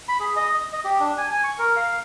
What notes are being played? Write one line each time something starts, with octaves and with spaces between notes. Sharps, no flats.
B5
G#4
D#5
D#5
D#5
G4
D4
G#5
G#5
C#6
A#4
F5